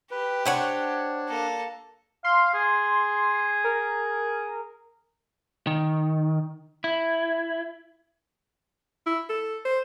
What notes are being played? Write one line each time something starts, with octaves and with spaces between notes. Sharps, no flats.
G4 B4
D4 C5 C#5 F#5
A#3 A4
F5 C6
G#4
A#4
D#3
E4
E4
A4
C5